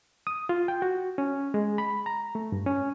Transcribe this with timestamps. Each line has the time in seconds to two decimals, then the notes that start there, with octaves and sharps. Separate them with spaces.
0.27 D#6
0.49 F4
0.68 G5
0.82 F#4
1.18 C#4
1.54 G#3
1.78 B5
2.06 A#5
2.35 A3
2.52 G2
2.66 C#4